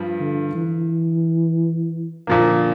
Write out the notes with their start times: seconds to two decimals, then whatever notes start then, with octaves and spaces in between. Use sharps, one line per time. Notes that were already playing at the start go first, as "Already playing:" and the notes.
Already playing: G2 F3
0.20 D3
0.55 E3
2.27 A#2 D3 F3 A#3